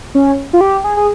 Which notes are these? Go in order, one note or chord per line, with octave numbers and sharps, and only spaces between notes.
C#4
F4
G4
G#4
G#4